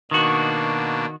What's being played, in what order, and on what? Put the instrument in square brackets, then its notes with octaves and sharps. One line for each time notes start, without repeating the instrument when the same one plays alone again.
[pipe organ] B2 A#3 D4 [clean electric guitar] D#3 F#4